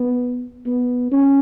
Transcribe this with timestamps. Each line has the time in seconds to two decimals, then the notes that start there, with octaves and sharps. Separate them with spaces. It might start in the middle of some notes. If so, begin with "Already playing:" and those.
Already playing: B3
0.66 B3
1.12 C#4